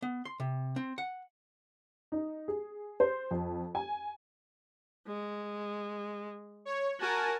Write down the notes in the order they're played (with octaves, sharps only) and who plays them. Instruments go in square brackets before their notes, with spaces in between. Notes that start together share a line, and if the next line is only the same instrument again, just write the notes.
[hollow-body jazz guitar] B3
C6
C3
C4
F#5
[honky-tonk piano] D#4
G#4
C5
F2
G#5
[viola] G#3
[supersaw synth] C#5
[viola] F#4 [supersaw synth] A#4 G#5 A5